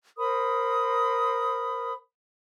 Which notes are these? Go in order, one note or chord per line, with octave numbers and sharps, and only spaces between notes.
A#4 C5 B5 D#6